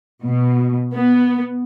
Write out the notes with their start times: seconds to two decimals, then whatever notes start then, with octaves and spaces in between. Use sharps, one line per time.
0.24 B2
0.94 B3